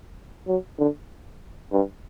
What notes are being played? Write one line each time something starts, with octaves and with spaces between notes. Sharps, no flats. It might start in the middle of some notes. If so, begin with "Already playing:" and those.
F#3
D3
G2